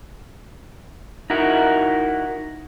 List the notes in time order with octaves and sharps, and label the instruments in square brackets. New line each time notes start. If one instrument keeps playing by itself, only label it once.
[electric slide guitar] D#4 E4 F#4 A#4